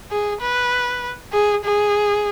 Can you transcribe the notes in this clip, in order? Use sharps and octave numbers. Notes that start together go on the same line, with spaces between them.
G#4
B4
G#4
G#4